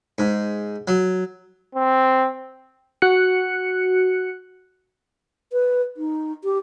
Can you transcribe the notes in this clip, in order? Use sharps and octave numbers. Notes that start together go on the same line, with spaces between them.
G#2
F#3
C4
F#4 F#6 C#7
B4
D#4
G4